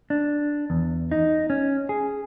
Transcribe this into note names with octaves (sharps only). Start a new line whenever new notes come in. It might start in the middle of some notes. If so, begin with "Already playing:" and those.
D4
E2
D#4
C#4
G#4